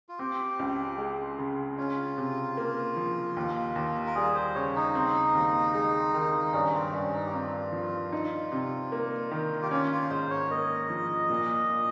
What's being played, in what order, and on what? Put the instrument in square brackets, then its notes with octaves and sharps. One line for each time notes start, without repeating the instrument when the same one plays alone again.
[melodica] F4
[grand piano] C4 [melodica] G4
[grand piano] C#2
G#3
C#3
[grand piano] C#4 [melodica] F4
[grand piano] C3
A#3
F3
D#2
D#2
[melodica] A#4
[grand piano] G3 [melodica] G#4
[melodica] C5
[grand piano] C#3 [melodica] C#5
[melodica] D#4
[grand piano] C4
D#2
G#3
D#3
[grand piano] G2 [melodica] C#4
[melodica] C4
[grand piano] G2 [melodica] C#4
[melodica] D#4
G4
[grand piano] C4 [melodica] F4
[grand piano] F3
D#4
C3
A#3
D#3
[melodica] G4
[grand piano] C#4 [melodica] F4
[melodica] F4
[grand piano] G#2 [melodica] C5
[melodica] C#5
[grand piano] A#3 [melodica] D#5
[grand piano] F3
A#2
A#2